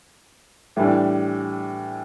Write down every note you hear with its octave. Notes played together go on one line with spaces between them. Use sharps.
A2 E3 G3 D4